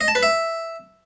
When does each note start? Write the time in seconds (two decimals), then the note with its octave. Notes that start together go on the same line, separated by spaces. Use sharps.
0.01 D#5
0.08 A5
0.15 B4
0.23 E5